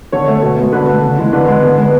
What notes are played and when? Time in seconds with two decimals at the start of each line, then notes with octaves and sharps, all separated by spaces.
0.12 D3 C#5
0.28 A3
0.42 B2
0.58 G#3 B3
0.72 D3 B4
0.87 A3
1.03 C#3
1.18 E3 G#3
1.33 D3 B4
1.48 G#3 B3
1.63 D3
1.77 G#3 B3